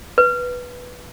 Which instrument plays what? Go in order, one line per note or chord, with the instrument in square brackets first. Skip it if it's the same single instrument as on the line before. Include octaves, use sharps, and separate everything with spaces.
[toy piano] B4